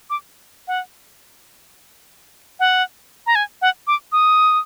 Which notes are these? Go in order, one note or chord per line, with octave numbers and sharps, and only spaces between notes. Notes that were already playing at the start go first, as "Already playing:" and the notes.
D6
F#5
F#5
A#5
G#5
F#5
D6
D#6